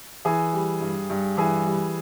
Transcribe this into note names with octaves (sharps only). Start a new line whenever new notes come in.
E3 G#4
G3
G2
G2
E3 G#4
G3